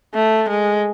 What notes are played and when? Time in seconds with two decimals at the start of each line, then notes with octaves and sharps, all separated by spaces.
0.14 A3
0.49 G#3